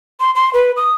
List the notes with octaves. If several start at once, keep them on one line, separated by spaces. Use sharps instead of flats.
C6
C6
B4
D#6